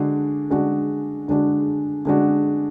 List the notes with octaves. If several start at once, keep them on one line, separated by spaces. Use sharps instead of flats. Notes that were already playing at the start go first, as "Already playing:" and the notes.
Already playing: D3 G#3 D4 F#4
D3 G#3 D4 F#4
D3 G#3 D4 F#4
D3 G#3 D4 F#4